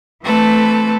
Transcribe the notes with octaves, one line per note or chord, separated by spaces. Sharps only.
E3 A3 C4 A4 B4